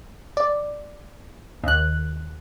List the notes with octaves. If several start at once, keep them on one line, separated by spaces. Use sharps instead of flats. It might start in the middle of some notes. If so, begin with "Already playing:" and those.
D5
D#2 F#6